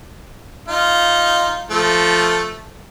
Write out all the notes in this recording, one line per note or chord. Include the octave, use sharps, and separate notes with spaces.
D#4 F4
F3 A3